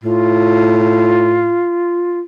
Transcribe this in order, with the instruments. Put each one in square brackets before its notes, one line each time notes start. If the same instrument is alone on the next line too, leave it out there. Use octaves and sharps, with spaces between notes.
[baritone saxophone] A2 [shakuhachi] F4